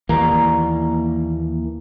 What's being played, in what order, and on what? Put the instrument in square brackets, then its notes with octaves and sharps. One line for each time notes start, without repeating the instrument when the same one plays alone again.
[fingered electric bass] D#2 E3 A#3 [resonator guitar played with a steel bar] B2 G3 A#5